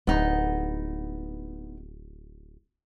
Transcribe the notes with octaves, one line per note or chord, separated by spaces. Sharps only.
D1 B3 D#4